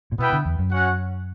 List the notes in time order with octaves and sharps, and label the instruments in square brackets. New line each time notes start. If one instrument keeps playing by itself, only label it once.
[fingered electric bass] A#2
[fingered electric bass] B2 [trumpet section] B3 E4 B4 E5 G5
[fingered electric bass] D3
E2
F#2
[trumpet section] C#4 F#4 C#5 F#5